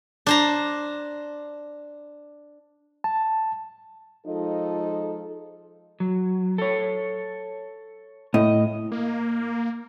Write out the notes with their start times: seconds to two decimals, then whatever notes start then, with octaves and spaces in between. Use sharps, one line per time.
0.27 D4 C5 A#5
3.04 A5
4.27 F3 G#3 D#4 F4 A4 D#5
6.00 F#3
6.58 A4 C#5
8.34 A2 D#5
8.92 A#3